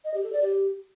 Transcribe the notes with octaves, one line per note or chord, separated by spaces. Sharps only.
D#5
G4
A4
D5
G4